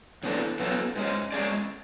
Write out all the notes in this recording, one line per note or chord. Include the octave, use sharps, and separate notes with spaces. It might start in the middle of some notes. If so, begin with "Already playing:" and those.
C#3 E3 B3 D4 A4
C#3 F#3 B3 F#4 A4
G#2 G#3 C#4
G#3 C#4 G#4 D5